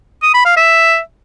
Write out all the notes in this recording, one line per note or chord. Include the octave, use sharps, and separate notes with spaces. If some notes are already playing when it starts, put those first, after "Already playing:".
D#6
B5
F5
E5